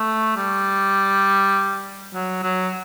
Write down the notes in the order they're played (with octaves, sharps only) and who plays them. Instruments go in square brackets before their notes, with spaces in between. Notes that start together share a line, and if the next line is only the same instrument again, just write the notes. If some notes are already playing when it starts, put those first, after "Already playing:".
Already playing: [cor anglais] A3
G3
F#3
F#3